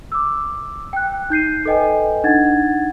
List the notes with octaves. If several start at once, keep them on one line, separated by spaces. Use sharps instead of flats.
D6 E6
G5 F#6
D#4 G6 C7 D#7
A4 B4 D#5 G5 G#5
D4 D#4 F#5 G#6 A6